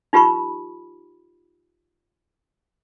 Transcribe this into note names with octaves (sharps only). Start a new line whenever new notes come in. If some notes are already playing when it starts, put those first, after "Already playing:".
D#4 F4 G4 B4 B5 C#6